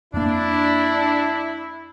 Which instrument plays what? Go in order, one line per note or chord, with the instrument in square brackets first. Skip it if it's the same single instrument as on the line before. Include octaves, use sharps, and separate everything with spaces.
[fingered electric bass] F2 A#3 [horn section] D4 [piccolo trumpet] E4